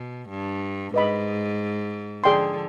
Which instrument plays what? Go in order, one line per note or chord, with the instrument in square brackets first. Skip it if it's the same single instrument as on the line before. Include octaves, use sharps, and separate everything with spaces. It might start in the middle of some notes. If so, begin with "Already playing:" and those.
Already playing: [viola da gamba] B2
G2
[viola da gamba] G#2 [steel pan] B4 D#5 B5
[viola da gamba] D3 F3 [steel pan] G#4 D5 G5 C6